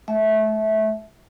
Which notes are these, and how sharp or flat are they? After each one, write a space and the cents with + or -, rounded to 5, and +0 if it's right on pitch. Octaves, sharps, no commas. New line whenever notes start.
A3 -30 E5 -15